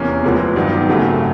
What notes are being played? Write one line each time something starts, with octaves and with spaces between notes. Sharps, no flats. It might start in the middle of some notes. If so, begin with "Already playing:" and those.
Already playing: E2 C3 A#3 C#4
D2 C3 F3 G#3 B3
G2 D#3 F#3 B3
G#1 F#2 C#3 F#3 A3